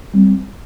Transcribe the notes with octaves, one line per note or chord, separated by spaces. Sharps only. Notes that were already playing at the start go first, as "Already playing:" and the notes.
G3 C4